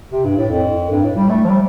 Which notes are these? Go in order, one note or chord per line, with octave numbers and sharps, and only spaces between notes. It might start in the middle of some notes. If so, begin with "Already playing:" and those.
C3
G2
A2
F2
G2
A2
G3
A3
F3
G3